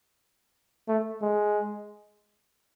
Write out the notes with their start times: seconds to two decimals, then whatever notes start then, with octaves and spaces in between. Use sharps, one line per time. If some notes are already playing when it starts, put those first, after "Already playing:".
0.88 A3
1.22 G#3